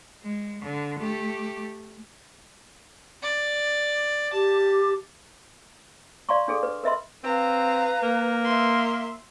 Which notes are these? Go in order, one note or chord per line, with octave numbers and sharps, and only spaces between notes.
G#3
D3
A3 G4
D5
G4 A5
D5 F5 A#5 C6 C#6
D4 G#4 A4
B4
A#4 B4 D#5 E5 B5 C6
C4 B4 F5 A#5
A#3
E5 C6